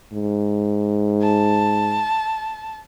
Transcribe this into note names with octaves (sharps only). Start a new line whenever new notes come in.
G#2
A5